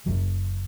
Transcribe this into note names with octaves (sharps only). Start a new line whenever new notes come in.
F#1 F#2 C#3 F#3